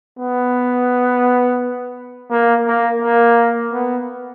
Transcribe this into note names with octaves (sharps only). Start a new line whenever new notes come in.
B3
A#3
A#3
A#3
B3